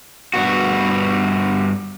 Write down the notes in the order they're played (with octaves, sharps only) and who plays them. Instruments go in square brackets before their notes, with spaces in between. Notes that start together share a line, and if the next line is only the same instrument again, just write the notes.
[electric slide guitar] G2 B3 F#4